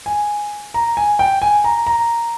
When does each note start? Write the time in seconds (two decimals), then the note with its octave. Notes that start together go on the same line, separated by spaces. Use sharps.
0.06 G#5
0.74 A#5
0.97 G#5
1.19 G5
1.42 G#5
1.64 A#5
1.86 A#5